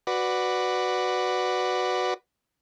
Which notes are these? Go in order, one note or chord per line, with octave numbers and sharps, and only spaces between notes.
F#4 B4 D5